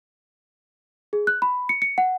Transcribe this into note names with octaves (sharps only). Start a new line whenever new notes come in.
G#4
F#6
B5
C#7
C#7
F#5